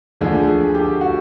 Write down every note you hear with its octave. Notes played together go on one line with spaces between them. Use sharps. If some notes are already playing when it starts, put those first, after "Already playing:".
D2 D3 F3 G#4
G#4
G4
F#4